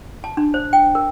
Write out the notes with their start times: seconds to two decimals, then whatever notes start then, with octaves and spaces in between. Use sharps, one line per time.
0.24 A5
0.37 D4
0.54 C5
0.73 G5
0.95 A#4